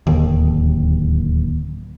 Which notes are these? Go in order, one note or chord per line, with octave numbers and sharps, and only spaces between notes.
D1 D#2